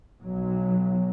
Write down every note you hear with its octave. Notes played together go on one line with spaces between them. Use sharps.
B1 F#3